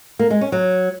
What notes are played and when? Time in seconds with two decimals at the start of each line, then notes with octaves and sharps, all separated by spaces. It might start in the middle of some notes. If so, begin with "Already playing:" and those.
0.19 A#3
0.30 G#3
0.41 C#4
0.52 F#3